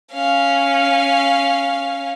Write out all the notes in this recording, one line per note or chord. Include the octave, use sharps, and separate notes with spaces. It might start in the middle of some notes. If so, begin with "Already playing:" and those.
C#4 F5